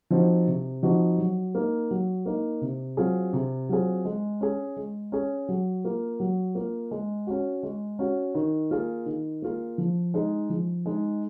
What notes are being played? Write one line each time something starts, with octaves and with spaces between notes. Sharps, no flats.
F3 C4 D#4 F#4
C3
F3 C4 D#4 F#4
F#3
A#3 D#4
F#3
A#3 D#4
C3
F#3 C4 F4 G#4
C3
F#3 C4 F4 G#4
G#3
C#4 G#4
G#3
C#4 G#4
F#3
A#3 F4
F#3
A#3 F4
G#3
C#4 F#4
G#3
C#4 F#4
D#3
A#3 F4 G#4
D#3
A#3 F4 G#4
F3
G#3 D#4 G#4
F3
G#3 D#4 G#4